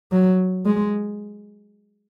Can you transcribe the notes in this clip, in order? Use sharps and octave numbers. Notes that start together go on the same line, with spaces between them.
F#3
G#3